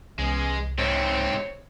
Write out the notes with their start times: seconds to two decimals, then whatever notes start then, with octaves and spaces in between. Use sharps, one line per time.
0.19 C2 E3 G#3 B3 C#4
0.79 G#2 C3 C4 C5 C#5